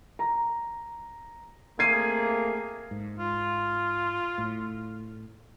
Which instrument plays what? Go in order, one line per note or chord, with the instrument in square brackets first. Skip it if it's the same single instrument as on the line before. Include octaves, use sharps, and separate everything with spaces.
[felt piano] A#5
[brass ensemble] A3 C4 G#4 [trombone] A#3 [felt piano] G#6 C7 D#7
[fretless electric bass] G#2
[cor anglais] F4
[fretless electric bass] A2